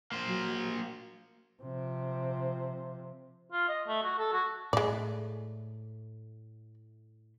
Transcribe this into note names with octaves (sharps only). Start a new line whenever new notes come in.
A#3 C5
F#3
C3 F3
F4
D#5
A3
F#4
A4
F#4
A2 G#3 A3 D5